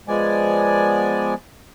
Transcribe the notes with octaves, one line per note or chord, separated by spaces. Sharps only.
F3 G#3 B3 D5 G#5